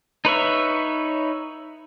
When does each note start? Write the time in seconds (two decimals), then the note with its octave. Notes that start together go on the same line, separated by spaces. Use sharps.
0.25 D#4 B4 C#5 E5